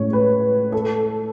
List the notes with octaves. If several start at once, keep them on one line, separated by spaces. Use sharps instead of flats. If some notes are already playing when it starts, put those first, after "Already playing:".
Already playing: A2 G#3 C#4 C#5
B4
A4